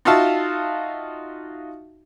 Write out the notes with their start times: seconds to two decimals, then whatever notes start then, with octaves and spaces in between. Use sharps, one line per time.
0.05 D#4 F4 F#4 E5 F5 A5